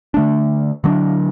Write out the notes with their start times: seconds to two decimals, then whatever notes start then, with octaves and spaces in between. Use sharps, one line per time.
0.14 D3 A3 D4
0.84 D3 F#3 B3 D4